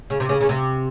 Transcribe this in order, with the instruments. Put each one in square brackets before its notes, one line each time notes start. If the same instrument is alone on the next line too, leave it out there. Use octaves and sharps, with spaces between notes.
[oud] C#3
C3
C#3
C#3
C3